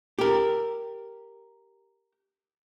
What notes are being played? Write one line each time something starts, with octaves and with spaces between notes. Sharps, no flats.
G4 A#4